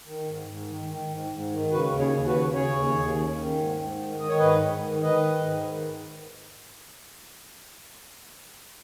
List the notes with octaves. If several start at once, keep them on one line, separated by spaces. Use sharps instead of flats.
D#3
G#2
G#2
D#3
D#3
G#2
G#2
D#3
C#3 F#4 B4
D#2
G#4 C#5
D#2
F#4 B4
C#3
C#3 G#4 C#5
D#2
D#2
C#3
D#3
G#2
G#2
D#3
D#3 D#5
C#5
G#2 B4 D#5
G#2
D#3
D#3 B4 D#5
G#2
G#2
D#3